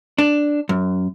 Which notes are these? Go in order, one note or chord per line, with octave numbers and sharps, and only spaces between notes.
D4
F#2